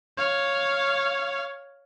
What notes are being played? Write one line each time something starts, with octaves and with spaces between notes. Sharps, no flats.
C#5 F5